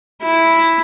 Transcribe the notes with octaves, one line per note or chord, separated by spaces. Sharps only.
E4